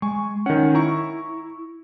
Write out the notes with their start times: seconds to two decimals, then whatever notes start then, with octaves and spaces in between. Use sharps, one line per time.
0.02 G#3 G#5 C#6
0.46 D#3 C#4 F#5
0.75 E4 A#5 C#6